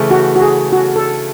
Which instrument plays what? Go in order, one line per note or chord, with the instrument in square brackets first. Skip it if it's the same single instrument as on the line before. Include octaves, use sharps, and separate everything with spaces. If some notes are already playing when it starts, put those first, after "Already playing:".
Already playing: [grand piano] C#3 E3 A3
[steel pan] F#4
F#4
G#4
F#4
A4